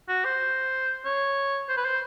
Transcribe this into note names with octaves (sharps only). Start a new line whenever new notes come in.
F#4
C5
C#5
C5
B4
C5